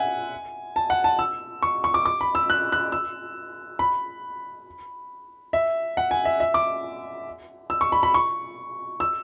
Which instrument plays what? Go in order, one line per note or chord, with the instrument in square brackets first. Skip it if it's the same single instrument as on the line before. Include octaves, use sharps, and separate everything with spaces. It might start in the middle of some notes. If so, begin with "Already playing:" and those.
Already playing: [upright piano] E5 F#5 G#5
A5
F#5
A5
E6
C#6
C#6
D6
D6
B5
E6
F#6
F#6
E6
B5
E5
F#5
G#5
E5
E5
D6
E6
C#6
B5
B5
C#6
E6